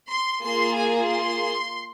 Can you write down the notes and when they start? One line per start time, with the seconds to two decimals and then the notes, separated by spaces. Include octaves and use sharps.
0.10 C6
0.42 A#3 F4 G#4 C6
0.75 G#5
1.07 C6